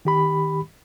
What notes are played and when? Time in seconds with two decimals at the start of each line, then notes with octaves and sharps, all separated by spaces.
0.05 D#3 G4 B5